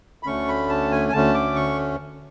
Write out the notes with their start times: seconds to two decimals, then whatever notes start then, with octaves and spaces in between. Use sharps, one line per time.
0.23 B5
0.26 D2 D3 A3 C#4 C#6
0.48 B5
0.69 A5
0.92 G#5
1.09 G#5
1.13 D2 D3 A3 C#4 A5
1.34 D6
1.55 C#6